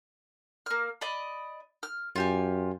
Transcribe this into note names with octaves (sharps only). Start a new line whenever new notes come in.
A#3 F6
D5 D#5 B5
F6
F#2 F4 G4 G#5